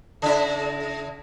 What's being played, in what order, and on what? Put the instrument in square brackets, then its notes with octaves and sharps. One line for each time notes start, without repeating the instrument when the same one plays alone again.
[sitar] C#3 E4